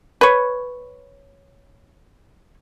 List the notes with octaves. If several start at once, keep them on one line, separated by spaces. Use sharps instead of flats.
B4 C#5